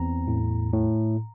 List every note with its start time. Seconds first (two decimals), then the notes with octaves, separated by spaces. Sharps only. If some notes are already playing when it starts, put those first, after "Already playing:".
Already playing: E2 C4 A#5
0.27 A2
0.73 A2